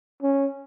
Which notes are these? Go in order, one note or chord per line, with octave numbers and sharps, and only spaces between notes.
C#4